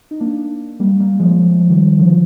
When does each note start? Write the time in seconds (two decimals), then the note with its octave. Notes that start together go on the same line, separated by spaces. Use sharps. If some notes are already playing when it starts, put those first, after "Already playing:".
0.11 D#4
0.20 A#3 D4
0.80 G3 A#3
1.00 G3 A#3
1.19 F3 G#3
1.40 F3 G#3
1.60 F3
1.70 D#3 G3
1.99 D3 F3